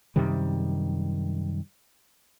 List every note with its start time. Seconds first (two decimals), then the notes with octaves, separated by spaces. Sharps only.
0.16 F#2 C3 D#3 G3